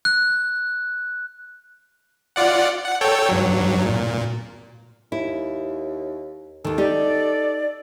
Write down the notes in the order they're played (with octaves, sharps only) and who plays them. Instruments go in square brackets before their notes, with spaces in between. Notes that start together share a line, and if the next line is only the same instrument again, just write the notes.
[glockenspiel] F#6
[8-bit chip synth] F4 D5 F#5
F#5
A4 C#5 G5
G2 F#3
A#2
[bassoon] D#2 [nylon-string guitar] E4
[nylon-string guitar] D#2 D#3 [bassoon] A4
[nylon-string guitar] D#4 G4 [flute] D5